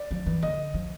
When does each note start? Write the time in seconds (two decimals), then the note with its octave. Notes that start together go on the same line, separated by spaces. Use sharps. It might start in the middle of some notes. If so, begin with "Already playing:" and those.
Already playing: D5
0.11 F3
0.26 E3
0.42 D3 D#5
0.74 F3